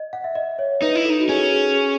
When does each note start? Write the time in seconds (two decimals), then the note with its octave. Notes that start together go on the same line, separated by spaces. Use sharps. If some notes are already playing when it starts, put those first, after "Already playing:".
Already playing: D#5
0.13 F#5
0.24 E5
0.35 D#5
0.59 C#5
0.82 D#4 B4
0.95 E4
1.05 A4
1.10 D#4
1.20 F#4
1.28 C#4 G#4
1.52 G#4
1.75 G#4